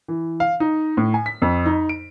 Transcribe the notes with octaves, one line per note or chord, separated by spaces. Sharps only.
E3
F5
D#4
A2
G#5
B6
F2
D#4
D7